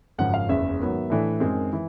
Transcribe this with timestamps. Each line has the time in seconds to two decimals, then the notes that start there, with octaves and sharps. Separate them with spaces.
0.18 G#1 F#2 C#3 F3 F#5
0.34 F5
0.49 F#1 E2 C#3 E5
0.80 G#2 D#3 F#3 B3
1.10 A2 E3 A3 D4
1.40 F#2 D#3 G#3 C4
1.73 E3